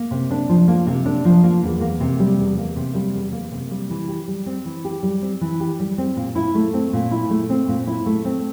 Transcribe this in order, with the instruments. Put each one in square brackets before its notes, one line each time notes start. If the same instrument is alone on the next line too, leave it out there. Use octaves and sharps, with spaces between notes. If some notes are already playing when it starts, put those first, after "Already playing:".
Already playing: [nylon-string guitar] A#3
C3
D4
F3
A#3
C3
D4
F3
A#3
E2
A#3
C3
G3
E2
A#3
C3
G3
E2
A#3
C3
G3
E3
G4
G3
C4
E3
G4
G3
C4
E3
G4
G3
C4
A#2
E4
A3
C4
A#2
E4
A3
C4
A#2
E4
A3
C4